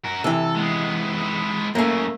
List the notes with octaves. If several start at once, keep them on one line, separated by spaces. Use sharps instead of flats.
F#4 A#4
C3 E3 A4
G#3 B3
F#2 C#3 A3 A#3